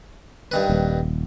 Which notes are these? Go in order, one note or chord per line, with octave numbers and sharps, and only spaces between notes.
G2 D#3 B4
D#1